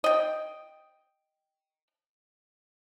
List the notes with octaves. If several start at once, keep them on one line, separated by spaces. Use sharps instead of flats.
D#5 G5